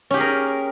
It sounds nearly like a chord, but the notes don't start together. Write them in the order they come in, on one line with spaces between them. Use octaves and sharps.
C#4 G4 G#4 A#4